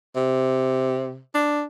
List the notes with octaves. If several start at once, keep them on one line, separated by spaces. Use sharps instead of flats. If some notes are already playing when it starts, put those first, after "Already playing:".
C3
D4